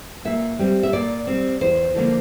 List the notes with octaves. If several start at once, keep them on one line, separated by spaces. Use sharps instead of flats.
A#2 E5
G3 C4
E5
A#2 D5
G3 C4
E2 C5
D3 F3 A#3 D4